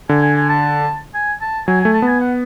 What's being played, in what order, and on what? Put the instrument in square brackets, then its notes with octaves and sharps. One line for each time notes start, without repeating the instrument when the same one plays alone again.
[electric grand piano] D3 [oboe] G#5
[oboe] G#5
G#5
A5
G#5
A5
[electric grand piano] F#3 [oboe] G#5
[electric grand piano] A3 [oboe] G#5
[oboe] A5
[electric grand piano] B3 [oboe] G#5
[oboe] F#5